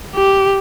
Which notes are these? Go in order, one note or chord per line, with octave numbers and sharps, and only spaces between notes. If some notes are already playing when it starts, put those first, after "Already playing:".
G4